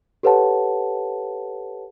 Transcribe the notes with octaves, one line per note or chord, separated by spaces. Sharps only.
G4 A4 B4 C#5 F#5 A5